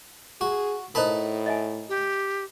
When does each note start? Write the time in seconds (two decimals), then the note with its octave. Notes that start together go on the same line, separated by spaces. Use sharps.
0.41 F#4 G#4
0.95 A2 D#4 A#4 C5 A5 B5
1.46 D#5 E5 G#5
1.89 G4